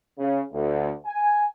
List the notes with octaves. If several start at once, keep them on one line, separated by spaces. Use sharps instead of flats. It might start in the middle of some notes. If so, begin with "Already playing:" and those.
C#3
D2
G#5